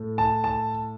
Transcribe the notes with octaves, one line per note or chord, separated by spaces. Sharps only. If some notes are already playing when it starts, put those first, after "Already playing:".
Already playing: A2 A3
A5
A5